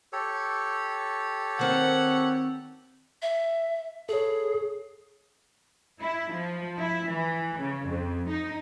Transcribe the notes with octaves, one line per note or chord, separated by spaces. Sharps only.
G4 A4 C#5
D#3 C4 A#4 F#5
E5
G#4 A4 C#5
E4
F3
E4
E3
C#3
F2
D#4